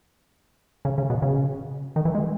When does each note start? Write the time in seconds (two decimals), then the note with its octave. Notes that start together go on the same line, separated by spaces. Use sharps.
0.85 C#3
0.98 C#3
1.10 B2
1.22 C#3
1.96 D#3
2.05 E3
2.15 G#3